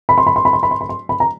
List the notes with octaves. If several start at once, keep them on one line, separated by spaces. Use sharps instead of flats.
B5
C6
B5
C6
B5
C6
B5
C6
B5
C6
B5
A#5